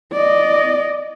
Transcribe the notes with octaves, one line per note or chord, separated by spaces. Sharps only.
D5 D#5